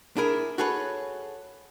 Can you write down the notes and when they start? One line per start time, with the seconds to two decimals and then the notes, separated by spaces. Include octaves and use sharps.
0.17 D4 E4 G#4 A#4
0.58 F#4 G#4 A4 B4 C#5